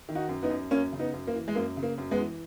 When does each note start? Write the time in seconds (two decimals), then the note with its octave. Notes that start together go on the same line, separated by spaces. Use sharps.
0.09 D#3
0.15 D#4 F#4
0.29 F#2
0.42 B3 D#4
0.50 F#2
0.71 F#2 A#3 C#4
0.92 C#3
0.99 B3 D#4
1.13 F#2
1.27 A#3
1.34 E3
1.48 G#3
1.55 F#2 A#3
1.77 C#3
1.83 A#3
1.98 F#2
2.11 G#3 B3
2.19 E3